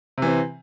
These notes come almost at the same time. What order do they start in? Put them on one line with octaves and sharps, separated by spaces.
C3 E3 C4